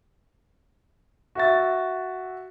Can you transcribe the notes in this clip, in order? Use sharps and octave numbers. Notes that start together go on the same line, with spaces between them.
F#4 E5 A6